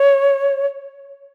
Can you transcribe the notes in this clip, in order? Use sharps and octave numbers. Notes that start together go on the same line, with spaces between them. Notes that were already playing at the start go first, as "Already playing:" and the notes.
Already playing: C#5